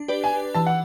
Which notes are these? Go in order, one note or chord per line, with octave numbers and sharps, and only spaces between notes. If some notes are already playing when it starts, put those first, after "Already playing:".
Already playing: D4
G4 B4 D5
G#5
E3 A5
F#5